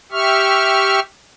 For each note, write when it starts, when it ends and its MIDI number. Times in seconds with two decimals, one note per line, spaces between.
0.12 1.00 67
0.12 1.00 76
0.12 1.00 85
0.12 1.00 89